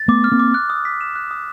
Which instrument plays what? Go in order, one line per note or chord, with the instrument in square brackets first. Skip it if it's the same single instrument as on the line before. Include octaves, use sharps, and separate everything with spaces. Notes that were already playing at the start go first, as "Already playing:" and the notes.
Already playing: [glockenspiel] A6
[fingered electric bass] A3 B3 [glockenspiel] D6
[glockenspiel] F6
[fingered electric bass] A#3 C4
[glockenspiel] D6
F#6
D#6
B6
E7
F#6
D#6